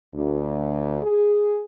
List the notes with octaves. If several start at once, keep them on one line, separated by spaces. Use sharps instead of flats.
D2
G#4